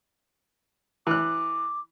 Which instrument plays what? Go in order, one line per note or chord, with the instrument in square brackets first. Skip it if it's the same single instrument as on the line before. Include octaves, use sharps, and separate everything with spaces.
[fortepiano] E3 F#6 [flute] D6